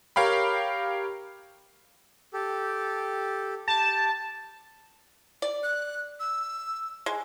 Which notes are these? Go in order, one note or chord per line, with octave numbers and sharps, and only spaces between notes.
G4 A#4 C#5 F5 G5 B5
G4 A4
G4 G5 A5
D5
F#6
E6
G#3